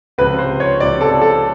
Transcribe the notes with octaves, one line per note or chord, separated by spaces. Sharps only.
C#2 C3 F3 B4
C5
C#5
C#2 C3 F3 D5
A4
A4